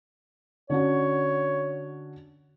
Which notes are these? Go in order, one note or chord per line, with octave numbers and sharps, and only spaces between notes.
D3 C#4 F#4 C#5